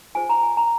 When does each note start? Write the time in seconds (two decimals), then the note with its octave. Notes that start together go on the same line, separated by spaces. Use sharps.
0.15 F4 G#4 C5 G#5
0.29 A#5
0.43 G#5
0.57 A#5